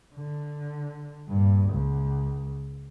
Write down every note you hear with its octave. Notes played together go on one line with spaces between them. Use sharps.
D3
G2 A#2
C#2